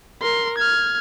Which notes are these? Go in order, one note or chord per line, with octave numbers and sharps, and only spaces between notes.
A#4 C6
F6 G#6